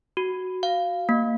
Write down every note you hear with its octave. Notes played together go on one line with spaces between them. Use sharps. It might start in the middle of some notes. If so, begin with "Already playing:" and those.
F#4
F5
A#3